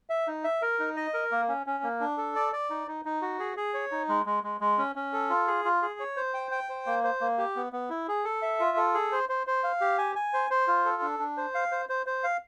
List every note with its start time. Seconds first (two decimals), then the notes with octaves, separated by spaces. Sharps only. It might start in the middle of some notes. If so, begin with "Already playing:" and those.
0.10 E5
0.27 D#4
0.44 E5
0.62 A#4
0.79 D#4
0.97 D#5
1.14 A#4
1.32 A#3
1.49 C#4
1.66 C#4
1.83 A#3
2.00 D4
2.17 A4
2.36 D5
2.53 D5
2.70 D#4
2.88 D#4
3.05 D#4
3.22 F#4
3.39 G#4
3.57 G#4
3.74 C#5
3.92 D#4
4.09 G#3
4.26 G#3
4.43 G#3
4.61 G#3
4.78 C#4
4.96 C#4
5.13 A4
5.30 F4
5.47 G#4
5.65 F4
5.82 G#4
6.00 C#5
6.17 C5
6.34 G5
6.51 G5
6.69 C5
6.86 A#3
7.04 C5
7.21 A#3
7.38 G4
7.56 B3
7.73 B3
7.90 E4
8.08 G#4
8.25 A4
8.42 E5
8.60 F4
8.77 A4
8.94 G#4
9.12 C5
9.29 C5
9.47 C5
9.64 F5
9.81 G4
9.98 G#5
10.15 G#5
10.33 C5
10.50 C5
10.67 F4
10.85 A4
11.02 D4
11.19 D4
11.37 C5
11.55 F5
11.72 C5
11.89 C5
12.06 C5
12.24 F5